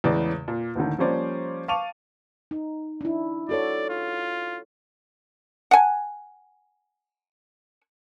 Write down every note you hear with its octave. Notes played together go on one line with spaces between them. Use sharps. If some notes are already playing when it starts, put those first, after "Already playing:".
E2 A2 C#3 G#3 D5
A#2
D#2 A2 D3 D#3
F3 G3 A#3 C#4 C5 D5
F5 A5 C#6 D6 D#7 F7
D#4
D4 E4
F#4 A4 C#5 D5
F4
F#5 G#5